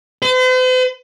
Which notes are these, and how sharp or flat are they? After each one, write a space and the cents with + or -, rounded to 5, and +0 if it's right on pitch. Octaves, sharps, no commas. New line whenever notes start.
C5 -45